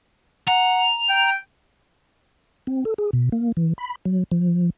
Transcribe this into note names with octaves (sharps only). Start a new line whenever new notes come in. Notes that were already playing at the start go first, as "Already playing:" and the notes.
F#5 A#5
G5
C4
A4
G#4
B2
A#3
E3
B5
F#3
F3